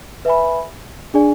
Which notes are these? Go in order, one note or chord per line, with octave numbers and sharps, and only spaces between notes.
B4 E5 G#5 B5
D4 G#4 D5 G#5